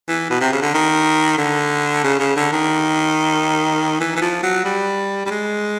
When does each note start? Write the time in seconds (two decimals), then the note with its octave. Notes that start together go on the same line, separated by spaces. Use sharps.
0.09 E3
0.30 B2
0.41 C3
0.53 C#3
0.62 D3
0.74 D#3
1.38 D3
2.04 C#3
2.20 C#3
2.36 D3
2.53 D#3
4.01 E3
4.16 E3
4.22 F3
4.44 F#3
4.65 G3
5.26 G3
5.31 G#3